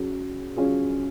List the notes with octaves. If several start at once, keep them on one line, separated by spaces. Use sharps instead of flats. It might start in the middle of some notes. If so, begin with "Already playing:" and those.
Already playing: F#3 C#4 G#4
F#3 C#4 F4 G#4